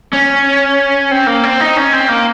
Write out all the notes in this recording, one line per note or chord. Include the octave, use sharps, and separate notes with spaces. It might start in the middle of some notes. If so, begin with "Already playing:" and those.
C#4
C4
A#3
C4
D#4
C#4
C4
A#3